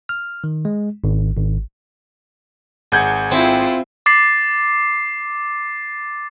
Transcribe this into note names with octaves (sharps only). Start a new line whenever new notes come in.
F6
D#3
G#3
G#1
G#1
G#1 G#4 F#5 G6 G#6
C4 E4 F4
D6 A6 C7